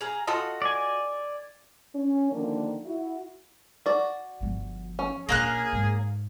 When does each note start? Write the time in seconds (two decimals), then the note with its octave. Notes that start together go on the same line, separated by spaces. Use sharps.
0.01 G#4 F5 A#5
0.27 F4 F#4 A4 D#5
0.62 D5 G#5
1.95 C#4
2.32 D3 D#3 F3 A#3 D4
2.84 E4 F#4
3.86 F#4 D5
4.41 G1 F3
4.99 C#4
5.29 A#1 A#3 F4 G#4 F5 F#6
5.73 G#2